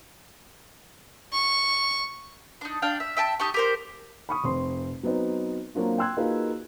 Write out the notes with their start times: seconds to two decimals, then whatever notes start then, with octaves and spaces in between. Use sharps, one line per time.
1.33 C#6
2.61 D4 D#4
2.82 D4 F5 G5
3.00 E5
3.17 E5 G5 A5
3.40 D#4 G4 A4 C#6
3.54 G4 A#4 C5
4.29 B5 C#6 D#6
4.44 F1 C4 C6
5.03 F#3 B3 C4 D#4 B4
5.75 F#3 A#3 C4 D4 F4 F#4
5.98 G5 C6 E6 F#6 G#6
6.17 A#3 D#4 F4 F#4 G#4 B4